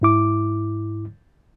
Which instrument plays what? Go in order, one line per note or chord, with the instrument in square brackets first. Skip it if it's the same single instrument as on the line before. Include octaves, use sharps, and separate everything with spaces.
[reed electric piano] G#2 E4 D6